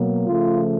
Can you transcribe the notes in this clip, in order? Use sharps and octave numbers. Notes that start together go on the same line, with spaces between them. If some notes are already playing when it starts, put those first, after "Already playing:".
Already playing: B2 F#3 A#3
C#3 F3 A3 F4